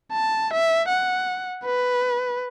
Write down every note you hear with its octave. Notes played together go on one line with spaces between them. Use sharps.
A5
E5
F#5
B4